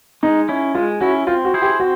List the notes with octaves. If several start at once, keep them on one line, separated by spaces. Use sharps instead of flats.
G#3 D#4
C#4 E4
G#3 F4
C#4 E4 F#4
C4 F4
F#4
E4 G#4 C5
G4
C4 F#4